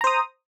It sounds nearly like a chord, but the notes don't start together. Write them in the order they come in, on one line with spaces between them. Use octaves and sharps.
A#5 C5 D#6